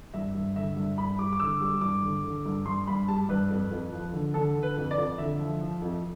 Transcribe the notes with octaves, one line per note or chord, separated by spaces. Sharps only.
G2 E5
G2
D3 E5
G2
G2 B5
G3 D6
D6
D3 E6
G3 D6
G2 D6
D3
D3
G2
G2 C6
G2 B5
G3 A5
G2 B4
F2
F2
F3
D3
D3 A4
D3
B4
F2
D5
F2
D3 E5
F3
F3
F2